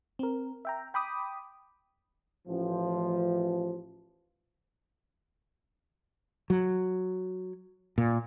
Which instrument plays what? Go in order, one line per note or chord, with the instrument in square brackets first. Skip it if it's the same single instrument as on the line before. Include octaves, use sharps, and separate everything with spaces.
[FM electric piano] C4 A#4
E5 G5 A#5
G5 B5 D6 D#6
[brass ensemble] A1 F3
[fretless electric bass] F#3
A#2